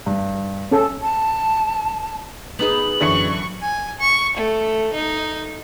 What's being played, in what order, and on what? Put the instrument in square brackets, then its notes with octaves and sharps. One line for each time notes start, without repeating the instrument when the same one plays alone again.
[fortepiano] G2
[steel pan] C#4 A4
[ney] A5
[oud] B3 D#4 G#4 [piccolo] F#7
[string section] F#2 C#6 [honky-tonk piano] D3 E3 C#7
[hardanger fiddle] G#5
C#6
A3
D#4